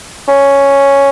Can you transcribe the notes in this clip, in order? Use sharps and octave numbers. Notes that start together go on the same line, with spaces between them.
C#4